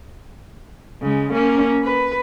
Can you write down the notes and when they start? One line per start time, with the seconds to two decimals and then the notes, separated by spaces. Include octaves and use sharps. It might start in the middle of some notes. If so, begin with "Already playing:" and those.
1.02 C#3 G#3
1.33 A#3 C#4
1.84 B4